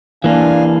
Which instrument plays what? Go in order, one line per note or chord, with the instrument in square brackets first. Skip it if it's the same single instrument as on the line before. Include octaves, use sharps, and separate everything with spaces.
[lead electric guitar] E3 A#3 [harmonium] D4 F5 G#5